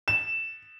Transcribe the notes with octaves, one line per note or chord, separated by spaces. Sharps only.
E7